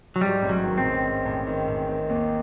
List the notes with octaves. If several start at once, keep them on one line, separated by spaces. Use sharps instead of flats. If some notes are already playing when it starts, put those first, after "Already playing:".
F#3
G#2 G3
A1
F#3
D#3
C4
A1
G#2
A1
D#3
A1
D#3
D#2